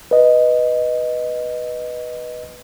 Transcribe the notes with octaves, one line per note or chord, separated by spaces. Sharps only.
B4 D#5